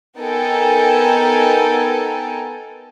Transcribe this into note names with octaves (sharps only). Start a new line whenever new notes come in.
B3 D#4 A4 A#4 G5 G#5